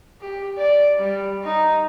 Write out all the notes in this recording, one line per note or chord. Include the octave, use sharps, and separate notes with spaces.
G4
D5
G3
D#4